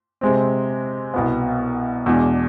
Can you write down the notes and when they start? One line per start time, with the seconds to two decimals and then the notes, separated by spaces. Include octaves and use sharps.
0.21 C3 G#3 C4
1.14 C2 B2 B3
2.06 E2 B2 G#3 D4